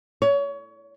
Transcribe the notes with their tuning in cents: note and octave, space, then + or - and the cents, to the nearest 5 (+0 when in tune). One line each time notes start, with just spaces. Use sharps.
C#5 +25